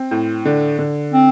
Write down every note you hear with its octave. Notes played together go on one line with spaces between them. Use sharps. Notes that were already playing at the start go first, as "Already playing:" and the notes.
Already playing: C4
A2
D3
D3
C4